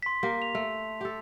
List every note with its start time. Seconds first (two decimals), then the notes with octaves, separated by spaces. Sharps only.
0.03 C6 B6
0.23 A#3 G4
0.42 F7
0.55 A3
1.01 G4 A4